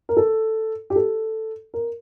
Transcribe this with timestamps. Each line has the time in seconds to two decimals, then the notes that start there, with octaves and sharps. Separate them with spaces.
0.09 A#4
0.17 A4
0.90 G4
0.96 A4
1.74 A#4